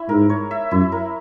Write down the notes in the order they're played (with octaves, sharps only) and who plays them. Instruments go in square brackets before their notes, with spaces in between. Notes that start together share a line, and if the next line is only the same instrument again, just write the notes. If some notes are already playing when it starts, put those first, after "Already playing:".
Already playing: [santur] E4 C#5 E5
[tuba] G#2 [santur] A#4
[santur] C#5
E5
[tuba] F#2 [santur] E4
[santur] A#4